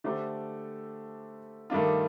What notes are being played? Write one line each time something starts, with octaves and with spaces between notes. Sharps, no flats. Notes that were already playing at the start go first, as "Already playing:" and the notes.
D3 A3 D4 G4 C5
G2 D#3 A3 D4 F4